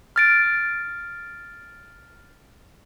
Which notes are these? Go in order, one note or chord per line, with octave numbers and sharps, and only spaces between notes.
F6 A6 D7